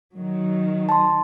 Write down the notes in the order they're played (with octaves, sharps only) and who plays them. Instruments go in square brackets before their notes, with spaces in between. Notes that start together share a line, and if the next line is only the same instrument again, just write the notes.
[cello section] D#3 F#3
[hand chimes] A5 C6